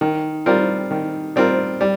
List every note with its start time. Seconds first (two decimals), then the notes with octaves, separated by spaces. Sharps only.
0.01 D#3
0.46 G3 C4 F4 A#4
0.91 D#3
1.36 G3 C4 F4 A#4
1.81 G3